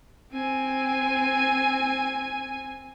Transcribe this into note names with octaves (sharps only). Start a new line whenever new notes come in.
C4 G#5